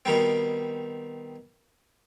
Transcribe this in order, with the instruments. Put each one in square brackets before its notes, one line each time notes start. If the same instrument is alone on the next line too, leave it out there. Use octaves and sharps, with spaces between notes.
[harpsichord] B2 D#3 G3 C4